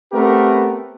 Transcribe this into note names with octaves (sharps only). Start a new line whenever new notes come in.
A3 B3 C4 G4 A#4 B4